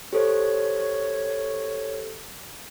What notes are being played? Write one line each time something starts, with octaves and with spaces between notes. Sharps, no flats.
G4 A4 C5 C#5